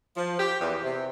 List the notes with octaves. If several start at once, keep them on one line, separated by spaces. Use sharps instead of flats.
F3
G4
E2
C3